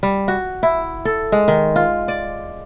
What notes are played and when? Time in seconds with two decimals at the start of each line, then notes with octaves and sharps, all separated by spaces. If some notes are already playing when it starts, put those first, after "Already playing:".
0.03 G3
0.28 F#4
0.63 E4
1.05 A4
1.32 G#3
1.48 D#3
1.76 F4
2.08 D5